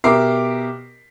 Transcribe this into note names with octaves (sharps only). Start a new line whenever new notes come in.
B2 G4 A#4 E5 D6 C7